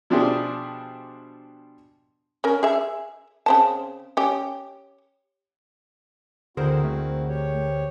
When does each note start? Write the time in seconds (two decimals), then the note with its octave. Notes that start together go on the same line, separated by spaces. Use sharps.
0.10 B2 F3 D4 E4 G4 G#4
2.44 C#4 A#4
2.63 G#4 E5
3.46 C#3 C4 A5
4.17 C#4 G4
6.57 D2 D3 C4 E4 F#4 G#4 A#4 C5
6.84 A3
7.29 G4 C#5